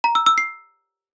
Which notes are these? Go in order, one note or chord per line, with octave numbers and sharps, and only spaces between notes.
A#5
E6
E6
C7